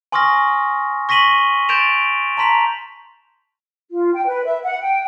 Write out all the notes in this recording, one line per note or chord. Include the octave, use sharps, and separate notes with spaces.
G#5 C6 C#6 D#6 F6 A#6
C#6 A#6 B6 D#7 F#7 G7
C6 G6 A6 D7 E7 F7
A5 A#5 C6 B6 F7
F4
G5
B4
E5
F#5
G5